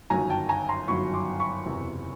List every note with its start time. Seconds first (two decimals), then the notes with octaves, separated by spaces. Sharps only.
0.10 G1 F#2 D#3 F#3 G#5 A#5
0.30 G5 A5
0.49 G#5 A#5
0.69 A#5 C6
0.88 G1 F#2 D#3 F#3 B5 C#6
1.14 C6 D6
1.40 B5 C#6
1.66 F#1 E2 C3 E3